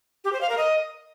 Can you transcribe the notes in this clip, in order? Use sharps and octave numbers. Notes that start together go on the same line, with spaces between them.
G4
C5
F5
A#4
D#5